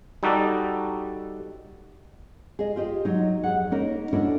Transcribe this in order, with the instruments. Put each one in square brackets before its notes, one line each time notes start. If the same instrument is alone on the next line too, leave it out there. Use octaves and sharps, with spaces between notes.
[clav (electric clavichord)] G3 D#4 F#4 A4 D5
[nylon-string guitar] G#4 D#5
F4 G4 D#5
F#3 D#4
F2 C#3 G#4 F#5
A#3 C#4 D#4 A#4
C#4 D4 E4 F#4 A4 A#4